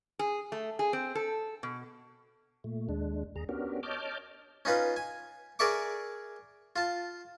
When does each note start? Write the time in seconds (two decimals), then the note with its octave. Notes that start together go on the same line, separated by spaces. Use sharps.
0.19 G#4
0.52 A3
0.79 G#4
0.93 C4
1.15 A4
1.63 B2
2.64 A#2 A3
2.89 D#2 G#3 D4
3.36 D#2 G#4 A#5
3.49 B3 C#4 D4 F#4 G4 A#4
3.83 C#5 D#5 A5 D6 F6 G6
4.65 C#4 D#4 F4 B4
4.96 G#5
5.59 G#4 A#4 D5 E5 C#6 D6
6.76 F4 A5